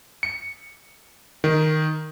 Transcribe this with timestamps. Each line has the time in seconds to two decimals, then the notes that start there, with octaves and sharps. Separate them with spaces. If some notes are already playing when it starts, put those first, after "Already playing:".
0.23 C#7
1.44 D#3